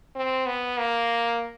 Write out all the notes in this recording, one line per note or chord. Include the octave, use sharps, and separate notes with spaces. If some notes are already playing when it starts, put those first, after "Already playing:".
C4
B3
A#3